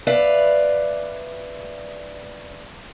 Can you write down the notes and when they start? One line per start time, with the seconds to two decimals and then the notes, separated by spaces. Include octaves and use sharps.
0.07 B4 D5 E5 F5